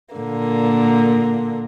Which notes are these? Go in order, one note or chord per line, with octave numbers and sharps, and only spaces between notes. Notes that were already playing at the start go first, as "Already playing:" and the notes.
A#2 D3 A#3